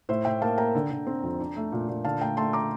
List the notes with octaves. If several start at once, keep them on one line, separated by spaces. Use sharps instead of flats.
A2 C5 E5
A2 E5 G5
A#3 F5 A5
A#3 G5 A#5
D3
D3
C4
F2
D4
A3
A#2
A#2
D3 F5 A5
A3 G5 A#5
A3 A5 C6
A#5 D6